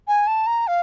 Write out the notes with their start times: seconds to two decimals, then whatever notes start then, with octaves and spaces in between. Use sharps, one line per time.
0.08 G#5
0.27 A5
0.47 A#5
0.67 F5